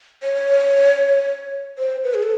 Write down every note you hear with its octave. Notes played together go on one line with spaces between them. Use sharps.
C#5
C5
B4
G#4
A4